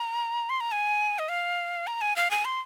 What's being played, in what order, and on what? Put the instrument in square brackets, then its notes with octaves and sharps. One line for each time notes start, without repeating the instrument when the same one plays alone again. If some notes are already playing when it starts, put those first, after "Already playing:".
Already playing: [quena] A#5
C6
A#5
G#5
D#5
F5
A#5
G#5
F5
G#5
C6